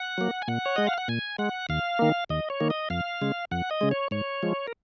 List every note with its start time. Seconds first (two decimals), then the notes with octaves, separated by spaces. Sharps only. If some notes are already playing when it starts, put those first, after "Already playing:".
Already playing: F#5
0.18 F#3 A#3
0.42 G#5
0.48 A#2 F#5
0.66 C#5
0.76 G#3 D#5
0.87 F5
0.98 F#5
1.08 A#2 G#5
1.38 G#3 F#5
1.69 D#2 F5
1.99 D#3 A#3
2.30 D#2 D#5
2.50 C#5
2.60 D#3 A#3
2.70 D#5
2.90 F2 F5
3.21 C#3 G#3
3.51 F2 F#5
3.71 D#5
3.81 C#3 G#3
3.91 C#5
4.11 G#2 C#5
4.43 F3 G#3
4.67 A#4